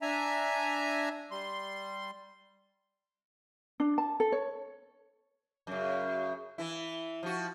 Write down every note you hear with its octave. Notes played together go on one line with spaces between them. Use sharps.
D4 E5 G#5 A#5
G3 C6
D4
A5
A4
C#5
F#2 C#3
E3 E4
F3 F#4